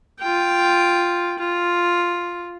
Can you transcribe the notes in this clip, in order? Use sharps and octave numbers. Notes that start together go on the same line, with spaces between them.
F4 G5
F4